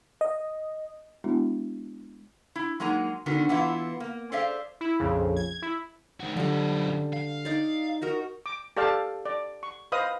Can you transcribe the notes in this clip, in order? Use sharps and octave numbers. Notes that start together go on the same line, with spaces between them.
D#5
G#3 B3 D4 E4 F#4
E4
F#3 G#3 A#3 D#4 A#5
D3 D#3 B3 F#4
E3 B3 E4 F4
A#3
G#4 A4 C5 D5 E5 F5
E4
A#1 F2 C#3
G#6
E4
D#3 F#4
F#2 D3 G3 D#5
F5
D#4 D5
D#4 F#4 A#4
D6
G4 A4 D5 F5 A5
D5
C#6
B4 C5 D#5 F5 D#6